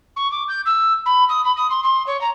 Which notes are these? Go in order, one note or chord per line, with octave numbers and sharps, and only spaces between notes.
C#6
D6
G6
E6
B5
D#6
B5
D#6
C6
C6
C#5
A#5